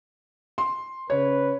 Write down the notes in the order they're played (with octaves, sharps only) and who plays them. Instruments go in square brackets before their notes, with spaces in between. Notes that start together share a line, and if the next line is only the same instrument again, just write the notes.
[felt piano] C6
[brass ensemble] C#3 B4 [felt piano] C#5